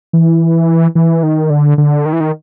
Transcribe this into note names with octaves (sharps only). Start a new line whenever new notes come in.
E3
E3
D#3
D3
D3
D#3
E3
D#3